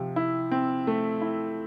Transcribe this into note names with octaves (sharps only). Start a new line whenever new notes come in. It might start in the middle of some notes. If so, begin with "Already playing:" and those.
Already playing: C3 F3
E4
C4
A3
E4